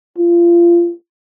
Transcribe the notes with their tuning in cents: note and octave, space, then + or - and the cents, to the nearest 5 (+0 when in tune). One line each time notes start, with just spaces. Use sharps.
F4 -25